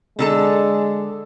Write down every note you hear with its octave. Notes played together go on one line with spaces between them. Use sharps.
D3 G#3 A4 A5